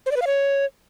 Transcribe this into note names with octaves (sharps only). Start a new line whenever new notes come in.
C5
D5
B4
F5
C#5